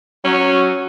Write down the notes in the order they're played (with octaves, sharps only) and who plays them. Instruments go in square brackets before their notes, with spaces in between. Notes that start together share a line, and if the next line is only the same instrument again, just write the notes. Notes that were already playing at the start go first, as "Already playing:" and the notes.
[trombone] F#3 [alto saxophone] C#4